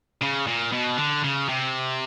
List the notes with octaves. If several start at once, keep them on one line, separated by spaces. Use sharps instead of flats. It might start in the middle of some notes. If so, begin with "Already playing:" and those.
C#3
A#2
B2
D3
C#3
C3